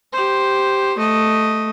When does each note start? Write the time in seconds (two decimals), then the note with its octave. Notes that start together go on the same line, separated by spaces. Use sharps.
0.13 G4 C5
0.98 A3 D#5